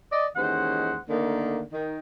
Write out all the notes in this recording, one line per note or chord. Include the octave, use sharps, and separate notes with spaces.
D5 D#5
D#2 E3 G#3 C#4 C5 F#5
D3 D#3 A3 A#3
D#3